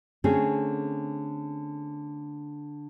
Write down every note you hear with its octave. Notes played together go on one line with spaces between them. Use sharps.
D3 A3 C4 C#4 G#4